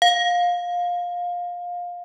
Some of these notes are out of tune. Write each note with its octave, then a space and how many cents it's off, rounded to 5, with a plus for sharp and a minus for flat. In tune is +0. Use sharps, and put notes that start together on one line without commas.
F5 +20